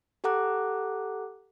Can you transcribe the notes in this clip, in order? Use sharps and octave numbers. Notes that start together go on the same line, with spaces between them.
G4 A4 F#5 A#5 D6 F#6